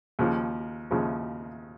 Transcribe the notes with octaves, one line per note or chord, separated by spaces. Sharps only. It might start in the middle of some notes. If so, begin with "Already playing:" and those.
D#2 C#3 F3
D#2 C#3 F3